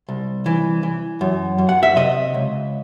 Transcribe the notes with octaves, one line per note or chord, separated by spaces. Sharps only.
C2
E3
E3
F#2
F#2
F#5
E5
C3 D#5
C#2